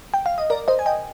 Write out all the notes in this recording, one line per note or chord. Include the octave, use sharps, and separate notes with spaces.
G5
F5
D#5
A#4 D5
C5 D#5
G#5
D#5 G5